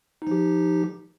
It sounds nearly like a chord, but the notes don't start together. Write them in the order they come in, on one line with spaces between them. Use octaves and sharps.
D#4 F3 G4